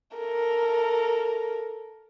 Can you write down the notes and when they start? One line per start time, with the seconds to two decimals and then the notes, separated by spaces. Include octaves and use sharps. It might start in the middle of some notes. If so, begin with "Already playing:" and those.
0.17 A4 A#4